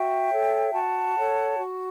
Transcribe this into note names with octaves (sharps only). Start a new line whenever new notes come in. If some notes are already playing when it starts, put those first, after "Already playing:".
Already playing: F#4 E5 G5
A4 C#5
F#4 F#5 A5
A4 C#5
F#4